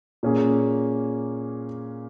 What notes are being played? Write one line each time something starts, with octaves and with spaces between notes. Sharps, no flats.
A#2 A#3 C#4 G#4